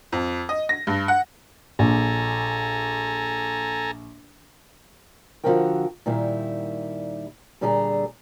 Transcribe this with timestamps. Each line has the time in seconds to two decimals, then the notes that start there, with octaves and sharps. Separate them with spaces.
0.12 F2
0.49 D#5
0.69 A#6
0.87 G2
1.08 F#5
1.79 A#1 A4 G#5 A#5
5.44 D3 F3 D4 F#4 A#4 G5
6.06 A#2 D#3 G3 E4
7.61 A#2 D3 G3 G#4 A4 A#5